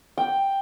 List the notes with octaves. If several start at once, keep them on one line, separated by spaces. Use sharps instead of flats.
G5